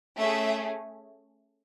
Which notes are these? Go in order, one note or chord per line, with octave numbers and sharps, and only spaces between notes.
A3 C#4 G#4 E5